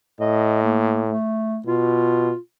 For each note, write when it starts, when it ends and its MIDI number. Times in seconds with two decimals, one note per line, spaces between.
0.20 1.13 45
0.20 0.61 75
0.62 1.02 58
1.09 1.59 57
1.66 2.32 47
1.66 2.37 65